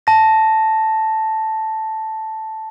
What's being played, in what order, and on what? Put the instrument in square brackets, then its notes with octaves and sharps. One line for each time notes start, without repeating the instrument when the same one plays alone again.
[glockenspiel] A5 A#6